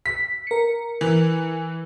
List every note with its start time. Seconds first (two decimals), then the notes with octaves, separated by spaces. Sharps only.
0.06 B6
0.47 A#4 C#7
1.01 E3